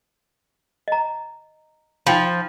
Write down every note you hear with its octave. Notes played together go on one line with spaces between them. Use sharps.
D#5 A#5
F3 D#4 G5 B5